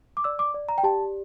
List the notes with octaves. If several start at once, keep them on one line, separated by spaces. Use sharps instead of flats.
D6
D5 E6
D6
D5
A#5
G5
G4 A5